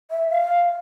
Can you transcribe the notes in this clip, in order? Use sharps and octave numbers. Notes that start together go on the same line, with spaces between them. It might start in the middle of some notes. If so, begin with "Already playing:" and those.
E5
F5